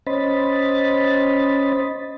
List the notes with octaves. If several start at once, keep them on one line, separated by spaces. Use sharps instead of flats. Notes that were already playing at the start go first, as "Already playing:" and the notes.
C#4 C5 D#5 B5 A6